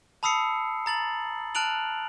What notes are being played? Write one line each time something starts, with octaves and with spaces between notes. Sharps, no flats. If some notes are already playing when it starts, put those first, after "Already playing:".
A5 B5 D#6 E6 C7 C#7
A#5 A6 F#7
A5 F6 F#6 D7 F7 F#7